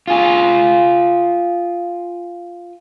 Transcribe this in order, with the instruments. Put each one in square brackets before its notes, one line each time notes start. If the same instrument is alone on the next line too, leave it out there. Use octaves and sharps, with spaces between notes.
[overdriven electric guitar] F4 G#4